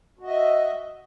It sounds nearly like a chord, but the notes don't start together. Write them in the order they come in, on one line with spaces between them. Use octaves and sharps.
F#4 D#5 E5